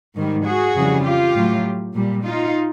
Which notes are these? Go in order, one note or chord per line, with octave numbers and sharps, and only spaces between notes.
G#2 D#3 G3
F#4 G#4
F2 C#3 E3 G3
F4 G4
A2 F#3 A3
A#2 G3
D#4 F4